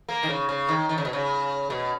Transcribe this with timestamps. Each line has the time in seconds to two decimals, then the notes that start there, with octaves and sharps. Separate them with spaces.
0.09 A#3
0.23 D#3
0.29 C#3
0.49 C#3
0.69 D#3
0.89 D#3
0.98 C#3
1.05 B2
1.13 C#3
1.70 B2